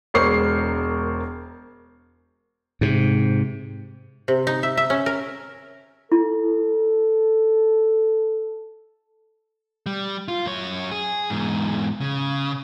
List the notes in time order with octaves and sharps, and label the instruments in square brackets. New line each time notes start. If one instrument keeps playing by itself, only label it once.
[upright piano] E1 G#3 A#4 C5 C#6 C7
[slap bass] G#2 C3
[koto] C3
D#4
E5
E5
C#4
A#4
[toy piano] E4 [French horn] A4
[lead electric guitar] G3
F4
F#2 C#5
G#4
E2 G#2
C#3